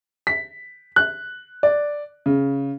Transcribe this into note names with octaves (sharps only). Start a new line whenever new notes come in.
B6
F#6
D5
C#3